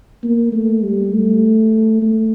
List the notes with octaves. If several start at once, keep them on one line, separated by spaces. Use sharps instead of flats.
A#3
A3
G3
A3
A3